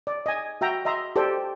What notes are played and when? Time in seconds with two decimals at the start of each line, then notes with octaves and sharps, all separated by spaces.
0.07 D5
0.26 D#5 G#5
0.61 F#4 E5 G5 A#5
0.85 D#5 E5 A#5 C6
1.16 G4 A4 C5 D5 G5